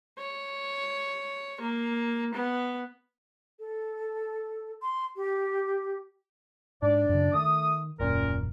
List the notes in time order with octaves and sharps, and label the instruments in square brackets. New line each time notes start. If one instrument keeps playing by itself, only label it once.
[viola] C#5
A#3
B3
[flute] A4
C6
G4
[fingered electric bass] G#2 [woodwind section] D4 D5
[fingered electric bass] F#2 C#3
[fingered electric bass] D#3 [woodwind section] A3 D#6
[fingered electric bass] D#1 G#1 F#2 [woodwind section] A#2 C#4 A#4